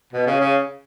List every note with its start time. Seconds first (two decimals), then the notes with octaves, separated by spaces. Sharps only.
0.13 B2
0.26 C#3
0.40 C#3